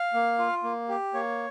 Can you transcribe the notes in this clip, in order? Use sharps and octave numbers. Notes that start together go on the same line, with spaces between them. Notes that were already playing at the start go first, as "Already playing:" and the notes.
Already playing: F5
A#3
F4
A#3
G4
A#3 C#5